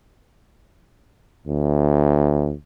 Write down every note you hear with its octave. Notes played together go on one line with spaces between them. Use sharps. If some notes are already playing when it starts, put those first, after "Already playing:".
D2